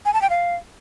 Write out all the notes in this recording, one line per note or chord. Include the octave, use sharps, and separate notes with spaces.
G#5
A5
G5
F5